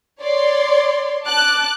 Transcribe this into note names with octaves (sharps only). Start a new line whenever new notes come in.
C#5 D5 C6
A5 D6 F#6